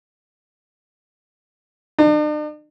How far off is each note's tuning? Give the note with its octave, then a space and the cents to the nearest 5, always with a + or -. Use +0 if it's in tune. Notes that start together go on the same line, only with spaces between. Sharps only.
D4 +45